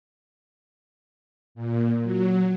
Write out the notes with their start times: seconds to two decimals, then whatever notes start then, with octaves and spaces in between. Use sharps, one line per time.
1.55 A#2
2.03 F#3